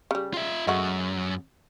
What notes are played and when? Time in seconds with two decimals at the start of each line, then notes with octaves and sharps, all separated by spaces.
0.11 C#3 G3
0.34 F4 E5
0.67 F#2 G#3 A3 F#4